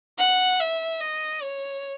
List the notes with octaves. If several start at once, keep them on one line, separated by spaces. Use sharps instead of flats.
F#5
E5
D#5
C#5